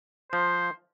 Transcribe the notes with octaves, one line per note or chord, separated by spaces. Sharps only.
F3 C5